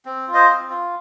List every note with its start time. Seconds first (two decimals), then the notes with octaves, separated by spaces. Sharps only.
0.06 C4
0.28 F4
0.34 C5 D#5
0.48 C4
0.70 F4